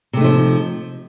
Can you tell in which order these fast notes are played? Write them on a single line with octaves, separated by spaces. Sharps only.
C3 A3 D#4 F3